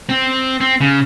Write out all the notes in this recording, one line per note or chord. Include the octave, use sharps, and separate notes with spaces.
C4
C4
C#3